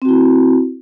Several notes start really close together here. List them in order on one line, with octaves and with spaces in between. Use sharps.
C4 F#4 E4